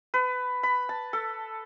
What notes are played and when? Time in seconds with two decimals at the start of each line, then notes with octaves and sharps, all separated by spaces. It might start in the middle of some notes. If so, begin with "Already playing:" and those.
0.14 B4
0.63 B5
0.89 A5
1.13 A4